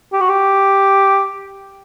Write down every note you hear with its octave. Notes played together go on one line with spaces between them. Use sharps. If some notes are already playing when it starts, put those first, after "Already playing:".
G4
F#4
G4